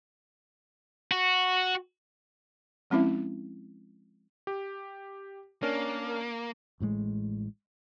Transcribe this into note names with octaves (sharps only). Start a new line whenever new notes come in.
F#4
F3 G#3 C4 C#4 E4 E5
G4
A#3 C#4 D4 A#4
A1 A2 C#3 G#3